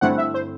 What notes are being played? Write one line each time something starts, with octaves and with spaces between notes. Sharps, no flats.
G2 D3 A3 C4 E4 F#5
E5
C5